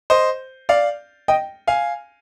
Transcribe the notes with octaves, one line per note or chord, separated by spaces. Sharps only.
C5 D#5
D5 F5
D#5 G5
F5 G#5